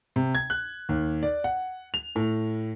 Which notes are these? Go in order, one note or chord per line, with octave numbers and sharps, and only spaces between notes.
C3
G#6
F#6
D#2
D5
F#5
F7
A2